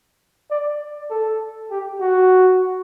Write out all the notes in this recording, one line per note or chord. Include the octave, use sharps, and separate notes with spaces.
D5
A4
G4
F#4